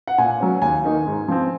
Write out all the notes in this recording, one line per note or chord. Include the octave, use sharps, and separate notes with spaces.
F#5
A#2 G#5
F#3 C#4
D#2 G#5
D#3 A#3 D#4
G#2
F3 C4